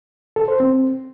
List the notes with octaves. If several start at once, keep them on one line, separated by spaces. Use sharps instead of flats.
A4
C5
C4